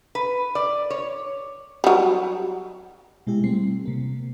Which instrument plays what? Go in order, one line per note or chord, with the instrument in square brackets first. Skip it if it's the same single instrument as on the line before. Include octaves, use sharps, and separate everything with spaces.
[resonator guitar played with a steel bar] B4
D5
C#5
[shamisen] F#3 G3
[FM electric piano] B2 G#3 E4 G4
G3 A3 C4 C7
C3 A#3